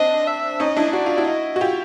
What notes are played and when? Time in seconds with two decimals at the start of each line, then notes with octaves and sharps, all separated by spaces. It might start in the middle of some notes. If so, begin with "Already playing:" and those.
Already playing: C4 D4 D#5
0.27 E5
0.60 C#4 D#4 D#5
0.77 D4 E4
0.93 F#4 D5
1.06 F4
1.17 E4 F#4
1.27 D#5
1.56 F#4
1.61 F4 G4